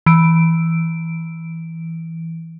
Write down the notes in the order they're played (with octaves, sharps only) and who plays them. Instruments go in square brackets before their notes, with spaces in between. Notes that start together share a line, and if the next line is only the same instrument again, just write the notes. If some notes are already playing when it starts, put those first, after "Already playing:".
[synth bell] E3 D7